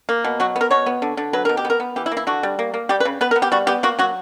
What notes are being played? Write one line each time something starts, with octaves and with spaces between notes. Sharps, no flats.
A#3
B2
F#3 F#4
B3
A#4
B2 C#5
B3
D3
D3
F#3 B4
B2 A#4
G4
B3
A#4
B3
E3 G4
E4
A#3
E4
D3 F#4
G3
A#3
A#3
G3 G4
B4
C#3
B3 B4
A#4
B3
G4
G3 F#4
B3 G4
A#3 F#4
F#3 F#4